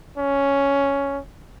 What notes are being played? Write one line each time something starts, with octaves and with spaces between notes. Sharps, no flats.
C#4